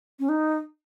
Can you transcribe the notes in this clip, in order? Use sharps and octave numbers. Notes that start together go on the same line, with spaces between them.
C#4
D#4